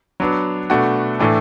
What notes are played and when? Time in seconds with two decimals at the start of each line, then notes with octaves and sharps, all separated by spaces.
0.20 F#3 B3 D4
0.70 B2 A3 D4 F#4
1.19 A2 E3 A3 D4